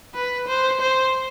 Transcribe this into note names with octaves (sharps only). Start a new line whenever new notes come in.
B4
C5
C5